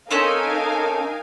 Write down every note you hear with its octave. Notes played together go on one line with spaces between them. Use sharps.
C4 C#4 D#4 A4 A#4 F5 G#5